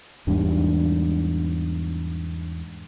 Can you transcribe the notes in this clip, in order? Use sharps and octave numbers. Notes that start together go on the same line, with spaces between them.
E2 G#2 G3 D4